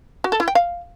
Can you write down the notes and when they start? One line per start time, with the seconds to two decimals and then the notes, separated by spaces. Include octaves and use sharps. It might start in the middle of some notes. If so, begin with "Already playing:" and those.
0.24 F#4
0.32 A4
0.40 E4
0.48 G5
0.55 F5